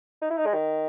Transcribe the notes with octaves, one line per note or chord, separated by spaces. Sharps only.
D#4
E4
D#4
G#3
D#3